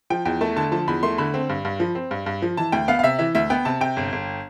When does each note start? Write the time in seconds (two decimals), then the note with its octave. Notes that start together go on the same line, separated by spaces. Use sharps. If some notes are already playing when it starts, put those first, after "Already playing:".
0.10 F3 G5
0.25 E2 G5
0.41 A3 A5
0.56 D3 A5
0.72 F3 A5
0.88 E2 B5
1.03 A3 C6
1.18 D3 B5
1.34 C4
1.49 G2
1.65 G2
1.80 F3
1.95 C4
2.11 G2
2.26 G2
2.42 F3
2.57 E3 A5
2.72 D2 G5
2.88 B3 F5
2.99 F5
3.03 C3 E5
3.19 E3 E5
3.35 D2 E5
3.50 B3 G5
3.65 C3 A5
3.81 C3 G5
3.97 G1
4.12 G1